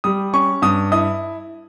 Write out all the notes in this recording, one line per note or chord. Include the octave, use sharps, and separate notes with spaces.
G3 D#6
C#4 C#6
G2 D#6
E4 D#6